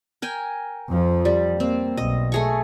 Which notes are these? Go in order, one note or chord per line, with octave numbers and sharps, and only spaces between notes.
A#4 G5 G#5
F2 F3
G3
A#3 C4
B1 D#5
A3 G#4 C#6